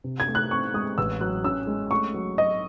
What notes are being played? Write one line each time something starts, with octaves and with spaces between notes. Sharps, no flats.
C3
G#6
A3
F#6
C4 C#6
G#3 D#6
A1 E6
F#3 F#6
C#4 E6
G#3
A3 C#6
F#3
F#3 D#5